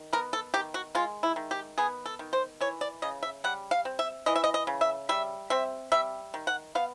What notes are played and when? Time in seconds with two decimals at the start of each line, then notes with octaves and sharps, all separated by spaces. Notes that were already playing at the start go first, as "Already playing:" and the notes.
Already playing: D#3
0.13 B3 A#4
0.33 A4
0.54 D#3 G4
0.74 F#4
0.95 G#3 F4
1.23 E4
1.36 D#3
1.51 G4
1.78 B3 G#4
2.06 A4
2.19 D#3
2.33 C5
2.61 E3 C#5
2.81 D5
3.02 C#3 D#5
3.23 E5
3.44 G3 F#5
3.71 F5
3.85 C4
3.99 E5
4.26 E3 D#5
4.36 E5
4.44 D#5
4.54 D#5
4.67 C#3
4.81 E5
5.09 G3 E5
5.50 C4 E5
5.92 G3 E5
6.34 D#3
6.47 F#5
6.75 B3 F5